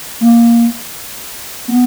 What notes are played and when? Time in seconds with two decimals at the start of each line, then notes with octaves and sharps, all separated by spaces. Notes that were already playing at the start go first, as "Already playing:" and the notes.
0.21 A#3
1.68 B3